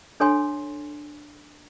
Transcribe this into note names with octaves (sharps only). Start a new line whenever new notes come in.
D4 A4 C#5 G#5 C6